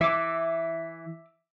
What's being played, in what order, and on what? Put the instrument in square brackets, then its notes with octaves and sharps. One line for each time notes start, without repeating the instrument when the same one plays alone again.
[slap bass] E3 [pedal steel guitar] E5 D6